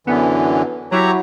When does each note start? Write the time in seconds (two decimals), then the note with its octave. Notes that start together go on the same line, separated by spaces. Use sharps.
0.07 F#2 D3 E3 B3
0.92 F#3 E4 G4 C#5 A#5